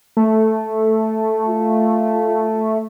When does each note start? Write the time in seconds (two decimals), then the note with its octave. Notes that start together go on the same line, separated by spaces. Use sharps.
0.17 A3
1.48 F4